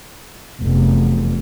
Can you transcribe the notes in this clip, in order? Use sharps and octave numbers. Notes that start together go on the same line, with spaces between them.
F1 E2